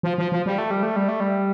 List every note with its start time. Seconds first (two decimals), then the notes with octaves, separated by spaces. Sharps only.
0.03 F3
0.18 F3
0.32 F3
0.46 G3
0.58 A3
0.71 G3
0.83 A3
0.96 G3
1.08 A3
1.20 G3